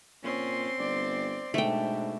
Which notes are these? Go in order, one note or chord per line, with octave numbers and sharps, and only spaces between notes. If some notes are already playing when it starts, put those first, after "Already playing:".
A#2 C4 C#4 C6
G1 D5
G#2 B2 A3 D4 G5